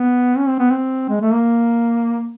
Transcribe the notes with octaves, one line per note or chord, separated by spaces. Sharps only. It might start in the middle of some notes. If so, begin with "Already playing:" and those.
Already playing: B3
C#4
C4
B3
C4
G#3
A3
A#3